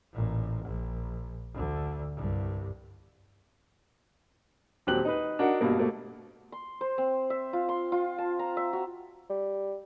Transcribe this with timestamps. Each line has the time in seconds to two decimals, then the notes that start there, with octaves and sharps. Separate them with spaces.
0.13 A1 A#2
0.66 A#1
1.54 D2 D3
2.16 C2 G2
4.87 D#1 F#3 C4 G4 F#6 F#7
5.05 D#4 B4
5.39 D4 D#4 F#4 A#4 F#5
5.61 G2 B2 A#3
5.79 B2 A3 A#3
6.52 C6
6.81 C5
6.98 C4
7.30 E5
7.53 F4
7.69 C6
7.92 F4
8.18 A5
8.39 A#5
8.57 E5
8.73 F#4
9.30 G3